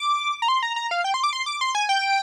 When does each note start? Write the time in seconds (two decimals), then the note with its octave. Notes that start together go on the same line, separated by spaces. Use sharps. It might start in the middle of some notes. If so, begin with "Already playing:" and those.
Already playing: D6
0.42 A#5
0.48 C6
0.63 A#5
0.76 A#5
0.91 F5
1.04 G5
1.14 C6
1.23 D6
1.33 C6
1.46 D6
1.61 C6
1.75 G#5
1.89 G5